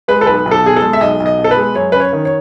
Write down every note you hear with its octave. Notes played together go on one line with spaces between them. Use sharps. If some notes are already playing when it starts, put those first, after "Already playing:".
G#3 B4
A4
B1 B4
B1
A4
B2 G#4
A4
G#3
E5
B1 D#5
B1
D#5
B2
A4
B4
G#3
F#2 C#5
C#4 B4
C#5
D#3
C#5